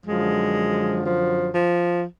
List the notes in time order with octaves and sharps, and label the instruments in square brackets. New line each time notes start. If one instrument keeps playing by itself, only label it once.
[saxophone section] F#2 D3 F3 G#3
F3
F3